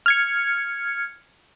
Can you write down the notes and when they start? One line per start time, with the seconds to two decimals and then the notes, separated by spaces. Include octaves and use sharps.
0.06 F6 G#6 C#7